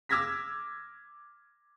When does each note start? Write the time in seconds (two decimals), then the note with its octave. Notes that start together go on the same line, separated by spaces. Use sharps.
0.09 D6 E6 F6 G#6 A#6 B6